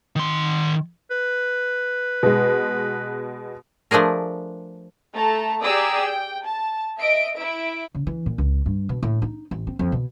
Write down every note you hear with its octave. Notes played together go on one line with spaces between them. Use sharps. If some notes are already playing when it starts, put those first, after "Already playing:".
D#3 C6
B4
B2 G#3
F3 A3 D4 G#4 A#4
A3 A4 A5 A#5
G4 G#4 D5 A#5 D#6 E6
G5
A5
D#5 E5 D7
E4 E5 D7
C#3
E3
A#2
C#2
G2
B2
A2
D#4
A1
C4
F2
B2